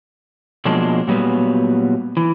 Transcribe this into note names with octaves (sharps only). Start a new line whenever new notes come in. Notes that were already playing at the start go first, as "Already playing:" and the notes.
B2 F3 F#3 G#3 A#3 D4
A#2 F#3 G3 B3
E3